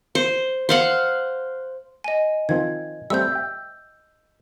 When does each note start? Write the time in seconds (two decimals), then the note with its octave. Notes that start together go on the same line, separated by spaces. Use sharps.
0.15 C5
0.69 C5 F5 F#5
2.04 D#5 G#5
2.49 D#3 F3 C4 G#6
3.10 G3 A3 C4 E6 G6
3.32 E5 G5